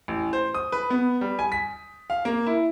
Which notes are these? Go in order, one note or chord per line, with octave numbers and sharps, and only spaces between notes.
A1
C5
D#6
B4
B3
G3
G#5
B6
F5
A#3
E4